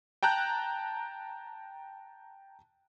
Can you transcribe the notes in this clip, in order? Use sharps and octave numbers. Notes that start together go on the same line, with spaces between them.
G5 A5 A#5 F#6 G6